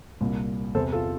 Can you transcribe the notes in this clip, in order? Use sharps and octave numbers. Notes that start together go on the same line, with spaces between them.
C2 A#2
E2 C3 E3 A4 C5
F4 A4